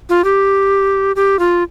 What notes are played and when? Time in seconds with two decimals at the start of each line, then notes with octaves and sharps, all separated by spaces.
0.09 F4
0.24 G4
1.16 G4
1.39 F4